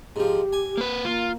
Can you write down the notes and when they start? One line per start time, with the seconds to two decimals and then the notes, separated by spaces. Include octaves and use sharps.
0.16 G#2 F3 G4
0.53 G#5
0.78 A#3 B4
1.05 A#3 F4